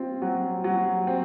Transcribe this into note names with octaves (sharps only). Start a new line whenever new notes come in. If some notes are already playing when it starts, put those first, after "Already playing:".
Already playing: C4 F4
F#3
F#3
C4